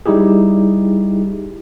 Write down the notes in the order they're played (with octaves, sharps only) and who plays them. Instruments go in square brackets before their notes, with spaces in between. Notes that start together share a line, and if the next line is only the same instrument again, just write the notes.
[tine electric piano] G3 D#4 E4 G4 G#4